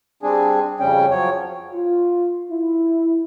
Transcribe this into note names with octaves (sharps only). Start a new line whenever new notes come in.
G3 C4 D4 G#4
F2 C#3 G3 C#4 G5
F3 F#3 C#5
F4
E4